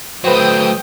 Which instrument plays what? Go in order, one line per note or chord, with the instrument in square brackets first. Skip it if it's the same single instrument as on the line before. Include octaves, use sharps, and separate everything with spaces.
[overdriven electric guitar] F#3 A3 [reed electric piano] B4 C5 [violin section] G5 D#6